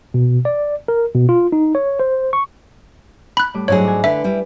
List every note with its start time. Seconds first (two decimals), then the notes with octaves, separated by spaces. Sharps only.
0.14 B2
0.45 D5
0.88 A#4
1.14 B2
1.29 F4
1.52 D#4
1.75 C#5
2.00 C5
2.33 C#6
3.37 B5 F#6
3.54 A2 G3 D6
3.68 G#2 F#3 D4 E4 G#4 C#5
3.84 G#5 D6
4.04 D3 B4 E5
4.24 G3 E4